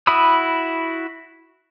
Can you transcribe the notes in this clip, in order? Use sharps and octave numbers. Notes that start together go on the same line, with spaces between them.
E4 F#4 B5 D#6 E6